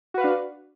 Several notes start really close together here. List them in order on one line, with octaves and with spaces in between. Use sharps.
F#4 B4 F5 D4